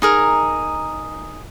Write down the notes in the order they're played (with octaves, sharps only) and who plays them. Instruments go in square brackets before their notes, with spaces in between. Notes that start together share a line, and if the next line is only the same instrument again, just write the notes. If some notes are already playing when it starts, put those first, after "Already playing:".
[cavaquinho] D#4 G#4 A#4